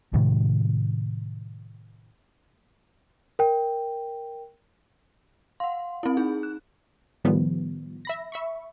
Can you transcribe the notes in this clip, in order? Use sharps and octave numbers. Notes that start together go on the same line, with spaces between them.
A2 C3 D#3 G#3
A#4 G5
F5 F#5 C6
C4 E4
D#4 G#4
F#6
A2 D#3 F3 G3 B3
E5 B5 A#6
E5 B5 C#6